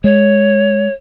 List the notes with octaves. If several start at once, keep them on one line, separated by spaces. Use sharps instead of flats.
G#3 C#5